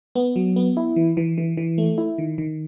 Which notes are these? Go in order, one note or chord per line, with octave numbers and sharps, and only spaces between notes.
B3
F#3
B3
E4
E3
E3
E3
E3
A3
E4
D#3
D#3